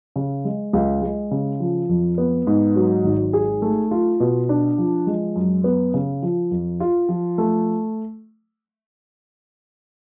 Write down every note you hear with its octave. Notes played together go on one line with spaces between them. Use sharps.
C#3
G#3
C#2
G#3
C#3
F3
F2
B3
G#2
F#3
G#1
G#4
A3
F4
B2
D4
F3
G#3
F#2
B3
C#3
F3
F2
F4
F3
A3